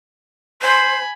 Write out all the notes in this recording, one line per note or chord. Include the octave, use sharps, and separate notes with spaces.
C5 G#5 B5